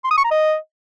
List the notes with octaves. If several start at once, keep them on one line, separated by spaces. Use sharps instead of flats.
C6
D#6
C#6
A#5
D#5